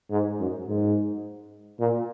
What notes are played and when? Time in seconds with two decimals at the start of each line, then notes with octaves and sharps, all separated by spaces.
0.10 G#2
0.39 F#2
0.67 G#2
1.79 A#2